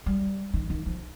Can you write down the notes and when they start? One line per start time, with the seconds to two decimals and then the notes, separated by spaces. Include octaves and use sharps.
0.06 G3
0.54 D#3
0.70 D#3
0.86 F3